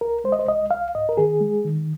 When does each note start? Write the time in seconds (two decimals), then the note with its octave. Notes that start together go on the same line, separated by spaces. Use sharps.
0.01 C2 A#4
0.24 G#3 C5
0.32 D#5
0.39 C5
0.47 C2 D#5
0.71 C2 F5
0.95 G#2 D#5
1.09 A#4
1.17 D#3 G#4
1.41 G#3
1.65 D#3